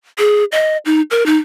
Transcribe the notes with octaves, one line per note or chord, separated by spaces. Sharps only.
G#4
D#5
D#4
A#4
D#4